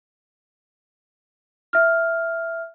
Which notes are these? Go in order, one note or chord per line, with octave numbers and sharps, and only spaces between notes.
E5 F6